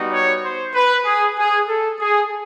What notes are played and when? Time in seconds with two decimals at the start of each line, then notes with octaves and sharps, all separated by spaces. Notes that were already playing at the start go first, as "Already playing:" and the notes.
Already playing: G3 B3 D#4 F#4
0.12 C#5
0.43 C5
0.74 B4
1.05 G#4
1.37 G#4
1.67 A4
1.99 G#4